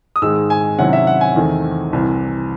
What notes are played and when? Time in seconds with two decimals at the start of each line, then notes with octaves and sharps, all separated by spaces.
0.16 D#6
0.22 G#2 D#3 G#3 E6
0.50 G#5
0.78 C3 D#3 F#3 C#4 E4 F#5
0.93 E5
1.07 F#5
1.21 G#5
1.35 E2 D#3 A3 C4
1.93 C2 C3 E3